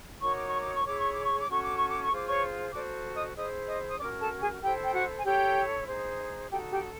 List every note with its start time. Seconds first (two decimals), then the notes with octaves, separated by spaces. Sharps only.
0.22 D#4 F#4 A#4 C#5 C#6
0.35 D6
0.48 C#6
0.61 D6
0.73 C#6
0.84 E4 G#4 C#5 D6
0.99 C#6
1.12 D6
1.26 C#6
1.38 D6
1.47 C#4 F#4 A4 C#6
1.64 D6
1.76 C#6
1.89 D6
2.02 C#6
2.10 F4 G#4 C5 D6
2.28 C#5 C#6
2.73 F#4 A4 C5 D5 D6
3.15 D#5 D#6
3.36 E4 G#4 C5 D#5 D#6
3.68 D#5 D#6
3.89 D#6
3.99 C#4 F#4 A#4 D5 D6
4.20 A4 A5
4.41 G#4 G#5
4.62 E4 G4 A4 C5 G5
4.84 G5
4.93 F#4 F#5
5.18 G#5
5.24 E4 G4 A4 C#5 G5
5.87 D#4 G#4 C5
6.50 D#4 F#4 G4 A4 G5
6.71 G4 G5